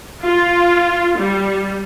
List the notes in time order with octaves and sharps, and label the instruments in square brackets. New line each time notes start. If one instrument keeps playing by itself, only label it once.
[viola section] F4
G3